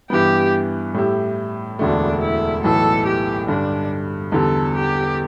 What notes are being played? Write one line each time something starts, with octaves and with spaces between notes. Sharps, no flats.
G2 E3 B3 G4
A2 G3 E4 G4
E1 D2 D3 A3 D4
E4
B1 A2 E3 A4
G4
G2 D3 G3 D4
E2 D3 G3 A4
G4